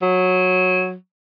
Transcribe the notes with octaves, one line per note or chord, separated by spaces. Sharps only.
F#3